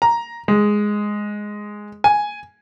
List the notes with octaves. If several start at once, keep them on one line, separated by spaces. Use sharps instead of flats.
A#5
G#3
G#5